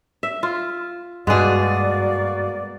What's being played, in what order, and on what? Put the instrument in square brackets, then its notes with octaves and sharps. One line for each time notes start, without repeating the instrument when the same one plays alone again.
[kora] E5
F4
[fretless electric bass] G2 [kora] B2 G#3 [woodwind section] A#3 F#4 D5 [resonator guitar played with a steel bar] B3 G#4